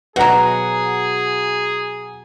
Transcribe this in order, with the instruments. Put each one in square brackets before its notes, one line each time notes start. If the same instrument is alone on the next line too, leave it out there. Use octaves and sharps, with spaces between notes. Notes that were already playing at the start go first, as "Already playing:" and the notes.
[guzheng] B2 F#3 [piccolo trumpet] G#4 [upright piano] F#5 A#5